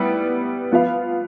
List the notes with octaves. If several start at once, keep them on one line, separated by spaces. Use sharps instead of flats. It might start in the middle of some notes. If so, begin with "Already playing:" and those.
Already playing: G3 B3 E4
F3 B3 F4 B4 F5